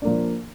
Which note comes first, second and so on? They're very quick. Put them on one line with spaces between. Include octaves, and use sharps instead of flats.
D4 A#3 F3